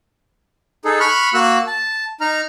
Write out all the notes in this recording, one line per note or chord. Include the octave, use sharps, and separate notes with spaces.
D#4 G#4 A4
B5 C#6 F6 F#6
A#3 F#4 E6 F#6
A5
D#4 A#5 F6